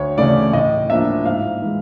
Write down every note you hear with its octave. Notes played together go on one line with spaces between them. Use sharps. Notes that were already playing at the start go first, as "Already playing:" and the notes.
Already playing: D2 C#5
C#3 E3 A3 D5
A2 D#5
F3 A#3 D4 E5
G#2 F5
E3 G#3